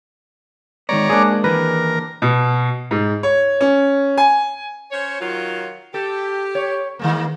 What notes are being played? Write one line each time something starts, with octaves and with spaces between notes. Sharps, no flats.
D#3 G#3 B3 C#5 D5 A#5
G#3 A#3 D4 G#4 C5 D6
D#2 E3 G#4 A#4 B4
B2
G#2
C#5
C#4
G#5
C#4 C5 C#5
D#3 F#3 F4
G4 A4
C#5
D#3 G#3 A#3